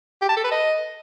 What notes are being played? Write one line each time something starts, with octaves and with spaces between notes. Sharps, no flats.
G4
A5
A4
B4
D#5